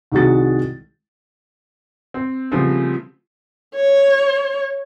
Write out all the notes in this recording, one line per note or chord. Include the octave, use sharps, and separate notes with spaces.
C2 D#3 G#3 F#4 A6
C4
C#3 F3 G3 A3 B3 C4
C#5